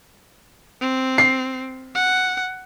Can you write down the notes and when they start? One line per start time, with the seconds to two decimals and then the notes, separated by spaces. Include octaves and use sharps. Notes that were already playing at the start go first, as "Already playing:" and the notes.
0.81 C4
1.18 C7
1.95 F#5